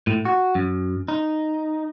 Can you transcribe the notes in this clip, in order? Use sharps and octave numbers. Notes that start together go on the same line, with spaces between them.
A2
F#4
F#2
D#4